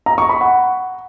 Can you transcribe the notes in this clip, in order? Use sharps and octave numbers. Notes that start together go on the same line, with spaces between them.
A#5
C#6
B5
F#5